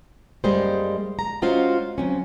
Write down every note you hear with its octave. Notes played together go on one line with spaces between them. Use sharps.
F#2 G3 G#3 A#3 C5
A#5
G#3 C#4 F4 F#4 C5 F5
F#3 C4 C#4